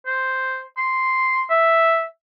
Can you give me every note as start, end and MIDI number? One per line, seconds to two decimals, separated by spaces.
0.07 0.61 72
0.77 1.44 84
1.50 2.04 76